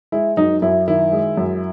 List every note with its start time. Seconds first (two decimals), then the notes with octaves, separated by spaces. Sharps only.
0.12 G#3 E4
0.37 F#2 D#4
0.62 F#2 E4
0.88 D#3 E4
1.12 G#3
1.37 F#2